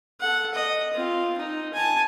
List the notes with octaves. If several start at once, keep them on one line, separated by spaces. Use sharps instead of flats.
A4 F#5
D#5
C4 F4
D#4
G#5 A5